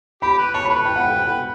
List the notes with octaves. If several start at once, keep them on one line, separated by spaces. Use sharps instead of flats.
G4 B5
B4
C#5 A5
B5
B4
G5
F#5
G5
G5